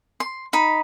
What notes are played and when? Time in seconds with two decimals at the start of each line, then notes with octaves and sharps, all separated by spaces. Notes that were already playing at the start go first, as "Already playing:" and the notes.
0.20 C6
0.53 D#4 B5